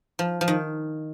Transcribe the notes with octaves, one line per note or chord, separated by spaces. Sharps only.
F3
F3
D#3